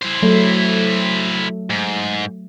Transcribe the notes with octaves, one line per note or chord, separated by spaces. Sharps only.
E4 C5
F#3 A3
G#2